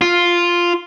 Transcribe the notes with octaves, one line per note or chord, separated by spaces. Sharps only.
F4